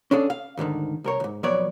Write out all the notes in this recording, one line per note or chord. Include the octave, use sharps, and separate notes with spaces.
C#4 D4 G#4 A4 F5
F5
D2 G#2 D3 D#3
C2 A#4 C#5
C#2 G#2
B1 F2 F#3 B3 C#5 D5